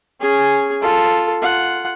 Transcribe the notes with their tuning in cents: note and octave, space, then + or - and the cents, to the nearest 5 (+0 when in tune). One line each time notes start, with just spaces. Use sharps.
C#4 +0 G#4 +0
F4 +0 A4 +0
F4 -5 F#5 +0